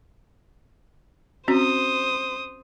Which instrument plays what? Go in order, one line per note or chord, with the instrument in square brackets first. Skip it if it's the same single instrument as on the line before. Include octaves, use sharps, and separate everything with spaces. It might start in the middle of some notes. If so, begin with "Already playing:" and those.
[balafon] C4 C#4 F#4 [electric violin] C5 D#6